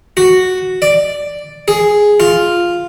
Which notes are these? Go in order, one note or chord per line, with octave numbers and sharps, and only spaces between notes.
F#4
D5
G#4
F4